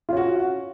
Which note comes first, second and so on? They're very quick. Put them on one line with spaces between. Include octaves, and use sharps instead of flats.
F4 C#4 F#4